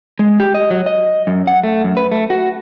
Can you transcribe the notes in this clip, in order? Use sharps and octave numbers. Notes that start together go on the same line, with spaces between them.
G#3
G4
D#5
F#3
D#5
F#2
F#5
A3
F#2
B4
A3
F#4